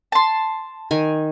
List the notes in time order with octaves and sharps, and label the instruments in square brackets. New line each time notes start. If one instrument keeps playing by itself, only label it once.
[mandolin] A5 C6
[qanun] D#3 G#5